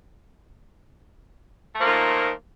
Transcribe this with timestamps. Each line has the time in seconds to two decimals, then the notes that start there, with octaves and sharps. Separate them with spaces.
1.75 A3
1.78 F3
1.81 A#3
1.84 D#3
1.87 A#2